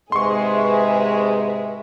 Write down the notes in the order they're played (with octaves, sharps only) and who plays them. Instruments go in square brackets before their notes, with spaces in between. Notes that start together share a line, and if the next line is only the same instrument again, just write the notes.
[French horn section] G#2 C3 G#3 [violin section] G#4 B4 E5 [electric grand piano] C6 C#6